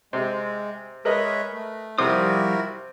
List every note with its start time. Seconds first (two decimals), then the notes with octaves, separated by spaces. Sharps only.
0.13 C3 G#3
1.05 G#3 A#4 B4 C#5 D#5 E5
1.52 A3
1.98 C3 F3 G3 E4 F#4 A#4 D#6